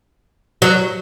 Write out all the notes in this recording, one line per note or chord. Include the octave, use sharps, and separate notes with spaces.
F#3